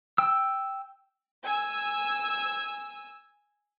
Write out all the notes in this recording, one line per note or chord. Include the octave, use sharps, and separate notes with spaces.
G5 E6
G#5 E6